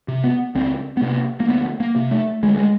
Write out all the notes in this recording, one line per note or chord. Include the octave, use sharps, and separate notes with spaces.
C3
B3
C#2 C4
B3
C3 A#3
A#3
D2 B3
A#3
C3
A3
D2 G#3
G#3